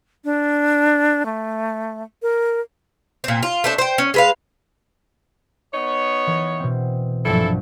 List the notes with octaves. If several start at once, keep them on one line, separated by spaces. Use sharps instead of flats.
D4
A3
A#4
A#2 C4
F4
A3 C4 D4
C5 G5
C#4
G#3 B4 F5
B3 D#4 C#5
E3 A#4
B2 C4
A#1 G2 E3 F#3 E4 A4